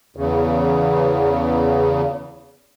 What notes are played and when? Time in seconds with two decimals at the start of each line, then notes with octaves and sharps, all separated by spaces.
0.17 E2 C#3